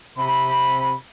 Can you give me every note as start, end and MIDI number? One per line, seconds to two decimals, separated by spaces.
0.17 0.94 48
0.17 0.94 83